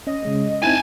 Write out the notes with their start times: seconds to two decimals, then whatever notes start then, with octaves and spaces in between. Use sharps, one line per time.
0.07 C#4 D#5
0.23 C#3 G#3 C#4
0.63 C4 D#4 E4 G#5 A5 G#6